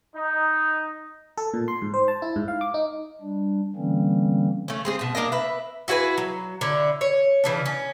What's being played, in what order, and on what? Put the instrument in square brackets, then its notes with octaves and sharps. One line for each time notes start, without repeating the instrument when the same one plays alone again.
[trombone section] D#4
[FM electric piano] A4
A#2
C6
G#2
C5
A5
E4
G#2
F5
D6
D#4
[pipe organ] G3 D4
D3 E3 G3 A#3 C4 C#4
[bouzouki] A3 C#4
G#3 C4 G#4
B2 A5
A#3 D4 A#4 D#5
B4 E5
E4 F#4 G#4 B4
F#3
D3 E4
C#5
C#3 E3 D4
C#4